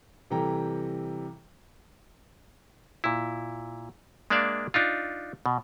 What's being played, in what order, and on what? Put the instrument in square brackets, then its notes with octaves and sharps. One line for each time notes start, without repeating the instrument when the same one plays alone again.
[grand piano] C3 E3 G3 A4 G5 A#5
[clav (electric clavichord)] A#2 E4
G#3 A#3 D4 D5 E5 F5
D4 D#4 F4
B2